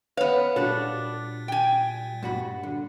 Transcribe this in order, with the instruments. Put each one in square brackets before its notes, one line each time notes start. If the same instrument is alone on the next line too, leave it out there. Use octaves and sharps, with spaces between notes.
[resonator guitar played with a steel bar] B3 F5 [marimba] B4 C#5
[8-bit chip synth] A#2 [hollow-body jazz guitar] G3 F#4 A4 [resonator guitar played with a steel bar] D4
[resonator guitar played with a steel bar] G5 G#5
[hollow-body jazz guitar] G2 F#4 B5
D3